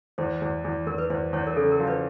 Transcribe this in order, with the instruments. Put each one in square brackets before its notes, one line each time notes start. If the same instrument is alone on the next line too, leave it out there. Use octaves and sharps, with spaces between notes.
[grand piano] E2 [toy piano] C5
[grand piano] E2
E2
[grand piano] E2 [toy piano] A#4
[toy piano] B4
[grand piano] E2 [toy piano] C5
[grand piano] E2 [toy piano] C#5
[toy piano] A#4
[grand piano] C#3 [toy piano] A4
[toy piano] A#4
[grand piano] F3
[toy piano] B4